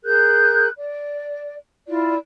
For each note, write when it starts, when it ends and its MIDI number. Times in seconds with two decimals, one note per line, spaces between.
0.04 0.67 68
0.04 0.67 70
0.04 0.67 90
0.04 0.67 91
0.77 1.55 74
1.88 2.15 64
1.88 2.15 65
1.88 2.15 74